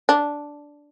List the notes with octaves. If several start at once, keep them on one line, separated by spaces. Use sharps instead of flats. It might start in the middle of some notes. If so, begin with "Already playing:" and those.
D4